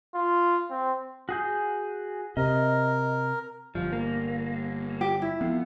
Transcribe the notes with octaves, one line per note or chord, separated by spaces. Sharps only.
F4
C4
F#4 G#4 G6
C3 A#4 D#5
G1 F3
A#3
G4
E4
F2 B3